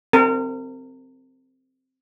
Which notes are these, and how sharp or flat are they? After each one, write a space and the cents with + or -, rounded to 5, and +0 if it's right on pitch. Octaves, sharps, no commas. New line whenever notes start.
C4 +0 A#4 -35